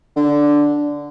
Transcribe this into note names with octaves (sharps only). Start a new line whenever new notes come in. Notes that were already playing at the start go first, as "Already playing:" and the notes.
D3